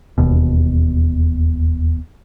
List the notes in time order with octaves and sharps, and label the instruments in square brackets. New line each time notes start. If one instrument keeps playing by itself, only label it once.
[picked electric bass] E1 D#2 B2